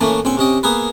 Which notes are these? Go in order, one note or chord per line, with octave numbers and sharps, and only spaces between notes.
A2 E3 A3 A#3 C#4
A#1 C4 C#4 G5 C#6
C3 C#4 D#5 G5
A#3 B3 G#4 A#4 B4